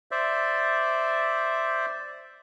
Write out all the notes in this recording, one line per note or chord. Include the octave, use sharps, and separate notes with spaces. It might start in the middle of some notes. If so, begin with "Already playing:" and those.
C5 D5 E5